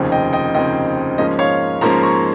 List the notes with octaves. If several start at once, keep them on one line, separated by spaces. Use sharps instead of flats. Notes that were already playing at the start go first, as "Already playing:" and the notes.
Already playing: F1 D#2 C#3 F3 C4
D#5 G5
D#5 G5
F1 D#2 C#3 F3 C4 D#5 G5
G#2 F3 A#3 C#4 D#5
C#5 F5
G#2 F3 A#3 C#4 A#5 C#6
A#5 C#6